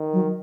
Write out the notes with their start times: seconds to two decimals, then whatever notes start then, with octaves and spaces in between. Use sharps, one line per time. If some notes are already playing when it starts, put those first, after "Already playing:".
Already playing: D#3
0.13 F#3